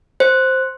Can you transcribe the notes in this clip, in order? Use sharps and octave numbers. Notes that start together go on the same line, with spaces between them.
C5